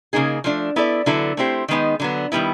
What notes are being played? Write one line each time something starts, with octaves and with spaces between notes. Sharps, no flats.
C#3 F3 A#3 D#4 G#4
F3 A3 D4
B3 E4 A4 D5
D3 F#3 B3 E4 A4
A3 C4 E4 G4 C5
D#3 G#3 B3 D#4
D3 F#3 B3
D#3 G3 B3 E4